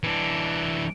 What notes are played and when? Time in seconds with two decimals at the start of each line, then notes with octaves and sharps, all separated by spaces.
0.03 E3 D4